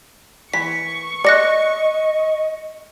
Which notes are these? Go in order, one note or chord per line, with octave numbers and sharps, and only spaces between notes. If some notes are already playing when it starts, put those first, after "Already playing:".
E3 C#6 B6
D5 D#5 F#6 A#6 C#7